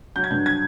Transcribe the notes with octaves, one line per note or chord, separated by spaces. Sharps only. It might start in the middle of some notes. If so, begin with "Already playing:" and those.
F#3 G6
G#6
G2 G6
G#6